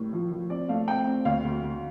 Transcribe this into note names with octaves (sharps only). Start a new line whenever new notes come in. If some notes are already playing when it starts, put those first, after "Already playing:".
Already playing: A2 G3 A#3
F3
F3
C4 D5
A3 F5
C4 G5
C4
D2 F5
D2
D2